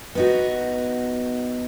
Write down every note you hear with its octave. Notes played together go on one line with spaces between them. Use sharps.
B3 D#4 F#4